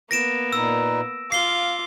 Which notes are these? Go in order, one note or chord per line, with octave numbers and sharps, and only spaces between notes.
A#3 B3 A#6 D7 E7
A#2 D#4 B4 E6
F4 F5 D6 C7 G7